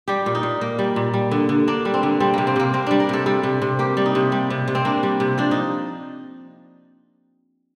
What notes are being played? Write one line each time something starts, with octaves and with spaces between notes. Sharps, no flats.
G3 G4
A#2
D#4
A#2
A#3
G3
A#2
G3
D3
D3
A#3 D4
G3
C4
D3
G3 C4
C3 A#3
C4
C3 A#3
A#3 C4
G3 D4
A#4
C3 A4
G3 A4
C3
C3
A#3 G4
G3
D#4
C3
G3
C3
C3
C4
A#3 D4
G3
C3
F3 D4
D#4